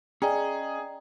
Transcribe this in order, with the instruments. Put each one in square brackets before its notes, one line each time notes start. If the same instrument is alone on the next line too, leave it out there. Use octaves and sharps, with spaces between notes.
[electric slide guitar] C#4 D#5 [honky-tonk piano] G#4 [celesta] D5 G5 A#5